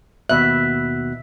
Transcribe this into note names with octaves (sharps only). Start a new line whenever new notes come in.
D#2 B2 E5 F#6